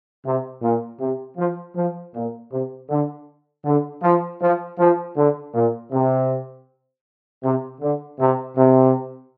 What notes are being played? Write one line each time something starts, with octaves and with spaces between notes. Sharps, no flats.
C3
A#2
C3
F3
F3
A#2
C3
D3
D3
F3
F3
F3
D3
A#2
C3
C3
D3
C3
C3